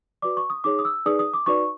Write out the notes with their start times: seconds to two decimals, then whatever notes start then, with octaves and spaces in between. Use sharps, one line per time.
0.22 F#4 B4 D5 D6
0.37 C#6
0.50 D#6
0.64 D#4 G#4 C#5 D6
0.79 D#6
0.85 E6
1.06 D#4 G#4 B4 D5 D#6
1.19 D#6
1.34 D6
1.46 D#4 F#4 B4 D5 C#6